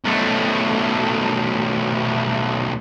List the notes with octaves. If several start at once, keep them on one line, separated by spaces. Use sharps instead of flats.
B1 A3